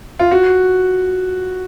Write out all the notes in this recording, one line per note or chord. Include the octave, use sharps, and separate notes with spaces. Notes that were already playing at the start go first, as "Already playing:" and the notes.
F4
F#4